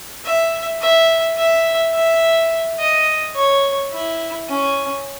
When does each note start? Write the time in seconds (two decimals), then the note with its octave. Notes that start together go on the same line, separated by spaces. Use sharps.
0.25 E5
0.81 E5
1.37 E5
1.94 E5
2.79 D#5
3.35 C#5
3.92 E4
4.48 C#4